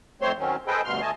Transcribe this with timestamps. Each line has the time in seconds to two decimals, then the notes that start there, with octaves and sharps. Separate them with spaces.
0.21 F2 A3 C4 C5 C#5 C6
0.39 D#3 F#3 C4 C#4
0.67 G#4 A4 B4 C5 D#5 G5
0.85 D2 G2 B2 C6 F6
1.02 D2 A3 D#5 G#5 A5